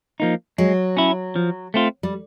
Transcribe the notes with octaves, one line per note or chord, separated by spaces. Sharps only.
F3 A#3 D#4
F#3 G#3
C#4 E4
F3
A3 C4 F4
G3